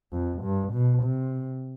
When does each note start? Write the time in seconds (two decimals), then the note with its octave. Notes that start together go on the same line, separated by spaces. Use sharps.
0.12 F2
0.43 G2
0.73 B2
1.03 C3